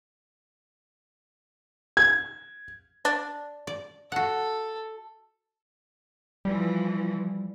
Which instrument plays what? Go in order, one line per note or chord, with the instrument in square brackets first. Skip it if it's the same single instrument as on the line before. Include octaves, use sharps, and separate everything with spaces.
[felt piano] G#6
[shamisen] D4
[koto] D5
[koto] F#4 F#5 [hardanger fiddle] A4
[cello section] E3 F3 [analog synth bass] G3